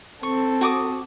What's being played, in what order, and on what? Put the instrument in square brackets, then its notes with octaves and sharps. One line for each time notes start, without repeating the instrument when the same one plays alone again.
[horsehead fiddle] C4 A4 [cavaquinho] C#6
[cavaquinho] F#4 D6 D#6